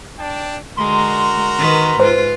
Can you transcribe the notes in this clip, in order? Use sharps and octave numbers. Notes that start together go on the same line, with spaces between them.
D4 G5 A5
D3 G#3 F#4 A#4 A#5 C6
D#3 B4
G#2 F4 B4 C5